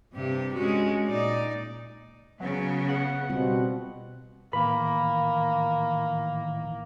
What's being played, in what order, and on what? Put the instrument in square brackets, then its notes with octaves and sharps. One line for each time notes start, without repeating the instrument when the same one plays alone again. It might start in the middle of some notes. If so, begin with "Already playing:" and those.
[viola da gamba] G2 C3 G4
G#3 C#4 F#4
A#2 D#4 D5
[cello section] C#3 B3 [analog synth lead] F#3
[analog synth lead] F#5
[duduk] B2 [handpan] G3 C4 F4
[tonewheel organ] A2 D#3 E3 [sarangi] A#3 [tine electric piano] B5